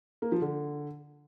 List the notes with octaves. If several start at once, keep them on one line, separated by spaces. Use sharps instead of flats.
A#3
F3
D3